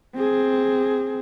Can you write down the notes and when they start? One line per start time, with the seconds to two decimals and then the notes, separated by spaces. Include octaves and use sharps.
0.16 C4 G#4